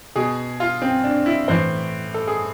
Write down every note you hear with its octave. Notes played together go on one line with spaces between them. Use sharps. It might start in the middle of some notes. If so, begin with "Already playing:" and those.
B2 G#4
F4
C4
D4
E4
A2 E3 C5
A4
G#4